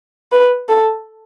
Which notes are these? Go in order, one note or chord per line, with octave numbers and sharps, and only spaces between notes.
B4
A4